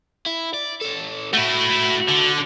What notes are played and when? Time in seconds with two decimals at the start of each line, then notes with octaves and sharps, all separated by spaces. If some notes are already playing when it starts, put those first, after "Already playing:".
0.26 E4
0.54 D5
0.81 C#4 A4
1.33 A3 E4 F#4
2.09 D3